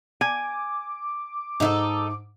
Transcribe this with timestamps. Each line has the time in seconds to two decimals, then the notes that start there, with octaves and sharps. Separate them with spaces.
0.21 G#5 D6
1.60 G#2 D#4 E4 A4